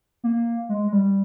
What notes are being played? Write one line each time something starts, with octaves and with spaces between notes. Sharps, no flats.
A#3
G#3
G#3
G3